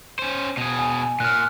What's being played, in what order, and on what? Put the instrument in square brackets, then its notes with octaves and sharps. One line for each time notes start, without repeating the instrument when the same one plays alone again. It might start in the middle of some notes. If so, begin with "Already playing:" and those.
[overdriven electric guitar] C#4 C5
B2 G#4
[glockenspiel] G#5
[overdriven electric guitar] A#2 [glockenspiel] F6 F#6